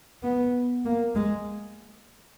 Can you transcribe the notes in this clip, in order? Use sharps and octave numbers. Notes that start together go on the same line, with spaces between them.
B3
A#3
G#3